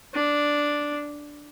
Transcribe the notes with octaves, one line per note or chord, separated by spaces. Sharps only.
D4